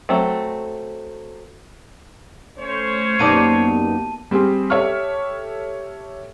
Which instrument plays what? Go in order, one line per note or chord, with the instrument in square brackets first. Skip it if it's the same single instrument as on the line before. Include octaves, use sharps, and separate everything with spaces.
[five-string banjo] F#3 A3 C4
[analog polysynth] A3 [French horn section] C#4 C5 C#5
[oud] F#2 D#4 D5 [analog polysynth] A#3 B3 G4 [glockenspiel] A5 D#7
[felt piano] G3 C4 G4 G#4
G4 A4 C#5 E5 C#6 F6